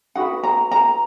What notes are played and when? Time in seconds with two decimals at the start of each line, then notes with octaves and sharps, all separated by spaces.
0.15 D#4 F#4 B4 F#5
0.43 A#5
0.71 A#5